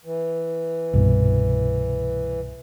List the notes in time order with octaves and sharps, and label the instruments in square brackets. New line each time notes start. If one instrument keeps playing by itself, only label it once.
[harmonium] E3
[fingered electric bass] C2 G2 B2